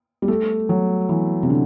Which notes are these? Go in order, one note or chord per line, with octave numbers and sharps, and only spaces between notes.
G3
A3
F#3
E3
C3
D3